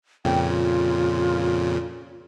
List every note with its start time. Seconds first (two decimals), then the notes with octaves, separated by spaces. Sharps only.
0.25 F2 A#2 C#3 G5
0.48 F4